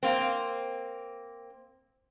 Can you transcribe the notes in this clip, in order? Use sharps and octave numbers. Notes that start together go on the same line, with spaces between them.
A#3 C4